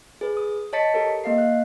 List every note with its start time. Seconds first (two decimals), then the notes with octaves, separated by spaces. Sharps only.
0.21 G#4 B4
0.37 D#6
0.73 C#5 D#5 A5 A6 B6 C#7
0.94 G4 A4 A#4
1.24 A#3 D#5 F5 C7
1.38 F5 F#6